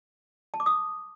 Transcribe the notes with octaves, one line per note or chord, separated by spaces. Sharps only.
A5
D6
D#6